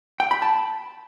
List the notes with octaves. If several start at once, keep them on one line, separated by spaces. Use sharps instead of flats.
G5
B5
A5